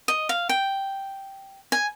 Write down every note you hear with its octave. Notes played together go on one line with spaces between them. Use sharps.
D#5
F5
G5
G#5